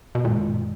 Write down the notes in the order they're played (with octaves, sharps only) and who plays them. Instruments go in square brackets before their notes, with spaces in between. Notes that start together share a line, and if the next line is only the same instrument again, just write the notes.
[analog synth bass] B2
[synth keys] G#1 F#2 D#3 G#3 [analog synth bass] A#2